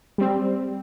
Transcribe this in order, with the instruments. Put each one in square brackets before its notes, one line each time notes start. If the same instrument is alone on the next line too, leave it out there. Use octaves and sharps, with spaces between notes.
[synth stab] G3 C4